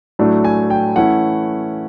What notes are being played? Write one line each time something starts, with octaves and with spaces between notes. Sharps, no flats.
A2 F#3 A3 D4
G#5
G5
E3 A3 C#4 E4 F#5